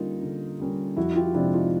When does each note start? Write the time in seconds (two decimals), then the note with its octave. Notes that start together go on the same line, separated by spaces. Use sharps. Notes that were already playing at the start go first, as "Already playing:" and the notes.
Already playing: D3 G3 A#3 C#4 D#4 F4
0.23 D3
0.60 G3 A#3 C#4
0.97 F2 E4 F#4
1.16 F4 G4
1.34 C3 F3 G#3 C4 D4 E4
1.53 D#4 F4